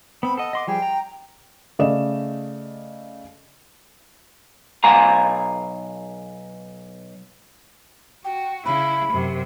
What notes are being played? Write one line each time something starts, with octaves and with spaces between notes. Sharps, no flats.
B3 C4 B5
A4 D#5 F#5
D#5 C6 D6
F3 G3 G#4 G5
A#5
C#3 A3 D5 D#5 E7
B1 F5 G#5 A#5
F#4 G5
C#3 E4 B5
F#2 C3